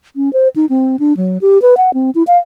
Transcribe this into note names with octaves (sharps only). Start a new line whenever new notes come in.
C#4
C5
D#4
C4
D4
F#3
G4
B4
F#5
C4
E4
F5